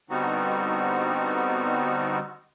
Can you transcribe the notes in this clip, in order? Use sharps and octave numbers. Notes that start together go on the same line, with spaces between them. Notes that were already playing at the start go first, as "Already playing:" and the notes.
D3 G3 B3 C4 D#4 F#4